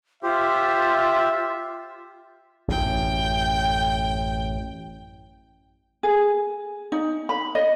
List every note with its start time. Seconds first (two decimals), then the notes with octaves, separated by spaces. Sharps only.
0.23 F4 G4 C5 E5
2.68 A1 F#2 G5
6.03 G#4
6.92 D#4
7.29 B5
7.55 D#5